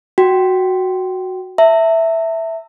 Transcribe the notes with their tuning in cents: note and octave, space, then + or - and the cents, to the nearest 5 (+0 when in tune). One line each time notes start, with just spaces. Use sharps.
F#4 +0 G5 -20
E5 +0 A5 +45